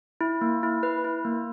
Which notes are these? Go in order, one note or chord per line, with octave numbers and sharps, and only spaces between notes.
E4
A#3
E4
B4
E4
A#3